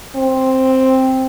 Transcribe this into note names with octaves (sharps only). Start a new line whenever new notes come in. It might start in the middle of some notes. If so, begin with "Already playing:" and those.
C4